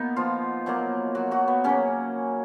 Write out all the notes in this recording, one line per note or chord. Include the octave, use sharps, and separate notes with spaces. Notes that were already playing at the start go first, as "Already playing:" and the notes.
Already playing: B2 A#3 B3 D#4
F3 F4
B2 F#3 A#3
F#3 F#4
F#3 F#4
B3
C#3 F#3 A#3 C#4